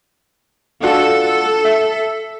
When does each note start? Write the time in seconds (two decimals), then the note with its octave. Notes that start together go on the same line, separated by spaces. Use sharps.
0.83 D4 F4 F#4 A4
1.64 E5